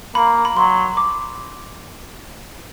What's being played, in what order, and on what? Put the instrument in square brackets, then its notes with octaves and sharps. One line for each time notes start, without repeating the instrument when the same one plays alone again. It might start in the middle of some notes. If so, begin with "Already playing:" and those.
[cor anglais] A#3 [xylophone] B5
[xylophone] B5
[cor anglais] F#3 [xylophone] C6
[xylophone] D6